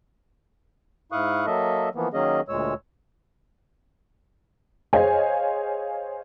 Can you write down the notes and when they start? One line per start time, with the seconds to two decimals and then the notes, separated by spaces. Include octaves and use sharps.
1.12 G#2 E4 F5 C#6 D#6 F#6
1.46 F#3 A#3 A4 D#5 E5
1.95 E3 F3 A#3 B3
2.13 D#3 F#3 A#3 C#4 G#4 D#5
2.48 D2 A#2 G#3 C#5 E6
4.93 G#4 C5 C#5 D#5 F5 G#5